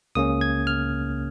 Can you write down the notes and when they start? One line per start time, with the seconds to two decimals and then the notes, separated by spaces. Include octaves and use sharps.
0.15 C#2 C#3 A#3 C#4 D#6
0.41 G#6
0.67 F6